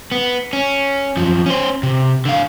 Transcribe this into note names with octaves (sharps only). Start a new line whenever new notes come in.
B3
C#4
F#2 F3
C#4 C5
C3
D3 F5